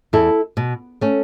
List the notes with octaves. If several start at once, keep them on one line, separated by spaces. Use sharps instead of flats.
E2 E4 A4
B2
A3 C#4